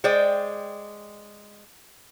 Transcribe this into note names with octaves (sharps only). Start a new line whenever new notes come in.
G#3 C5 D5 G5